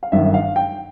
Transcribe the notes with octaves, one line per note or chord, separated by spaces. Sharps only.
F5
G1 F#2 D#3 E5
F5
G5